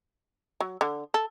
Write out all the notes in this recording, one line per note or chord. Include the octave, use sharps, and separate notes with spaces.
F#3
D3
A4